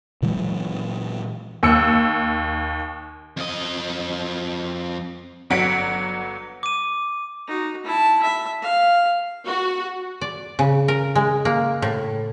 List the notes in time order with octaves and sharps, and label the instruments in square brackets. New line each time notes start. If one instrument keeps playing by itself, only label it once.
[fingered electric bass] A#2 E3 F#3 G#3
[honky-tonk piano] D#2 E6 C#7
[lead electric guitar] F2 D#5
[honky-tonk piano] G1 F#3 F#5 B6 D7
[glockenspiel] D6 D#7
[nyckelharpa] D#4 F#4
E4 A5
E5
F5
[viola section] F#4
[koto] D5
C#3
A#4
G#3
A#3
A2